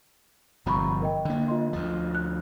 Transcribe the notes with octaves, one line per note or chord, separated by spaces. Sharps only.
G1 C3 F3 A#5 B5 C#6
A#4 D#5 G5
D3 A#3
F4 D#5 C6
D2 F3
F#6